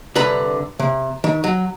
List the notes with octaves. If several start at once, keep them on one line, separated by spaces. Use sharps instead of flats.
C2 D3 B4 A#5
C3
D#3
F#3